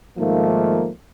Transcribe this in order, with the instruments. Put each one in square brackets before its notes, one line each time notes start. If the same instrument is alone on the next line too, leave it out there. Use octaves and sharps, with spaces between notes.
[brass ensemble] G#2 D#3 F3 A3 A#3